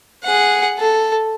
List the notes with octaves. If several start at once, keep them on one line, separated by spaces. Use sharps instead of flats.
G#4 F#5
A4